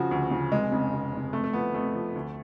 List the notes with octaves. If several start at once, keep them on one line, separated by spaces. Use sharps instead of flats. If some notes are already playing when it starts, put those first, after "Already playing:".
Already playing: C#3 F3 F#4
D2
C#3 F3
F1 G#3
F2 C#3
F1
F2 C#3
F2 A3
A3
F3 B3
F2 A3
F3
D2